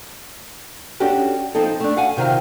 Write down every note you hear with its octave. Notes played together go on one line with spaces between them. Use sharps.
C#4 D4 F#4 G4 A4
F3 C4 D#4 A4
A3 D4
F5 F#5 G#5
C3 D#3 C4 F4 F5